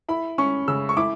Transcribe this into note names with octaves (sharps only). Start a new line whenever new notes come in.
E4 B5
C#4 C#6
C#3 E6
C#6
E4 D6